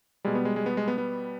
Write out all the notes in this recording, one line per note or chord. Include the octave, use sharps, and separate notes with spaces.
B2 G3 G#3
B3
G#3
G#3
B3
G#3
B3
B3